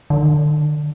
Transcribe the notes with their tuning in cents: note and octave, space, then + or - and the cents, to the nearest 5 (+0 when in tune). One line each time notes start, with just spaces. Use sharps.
D3 +40